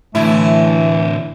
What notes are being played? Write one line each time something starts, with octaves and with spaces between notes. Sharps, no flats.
A2 D3 E3 A3 E4